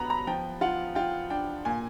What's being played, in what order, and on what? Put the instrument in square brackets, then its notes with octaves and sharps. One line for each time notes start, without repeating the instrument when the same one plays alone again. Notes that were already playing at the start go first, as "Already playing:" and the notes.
Already playing: [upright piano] D3 F#3 B3 A#5 B5
A#5
F3 G5
F4 F#5
F4 G5
D4 G5
A#2 G#5